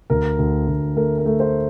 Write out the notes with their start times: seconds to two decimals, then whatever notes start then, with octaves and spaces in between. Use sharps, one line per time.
0.10 D2 A#4
0.39 D2
0.68 D2
0.96 A3 A#4
1.18 A#4
1.26 A3
1.40 C5